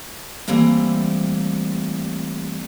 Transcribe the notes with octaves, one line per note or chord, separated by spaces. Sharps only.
E3 G3 A3 A#3 C4